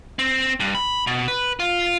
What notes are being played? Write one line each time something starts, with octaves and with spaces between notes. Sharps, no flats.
C4
G2
B5
B2
B4
F4